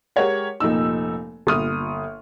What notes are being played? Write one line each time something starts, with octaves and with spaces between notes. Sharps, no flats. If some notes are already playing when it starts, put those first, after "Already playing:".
G#3 G4 A#4 C#5 F#5
F1 A#2 D#4 E6
G1 A#2 D#6 F6